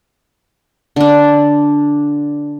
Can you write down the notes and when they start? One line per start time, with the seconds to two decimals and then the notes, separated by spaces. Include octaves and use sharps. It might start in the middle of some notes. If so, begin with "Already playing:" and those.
0.96 D3 D4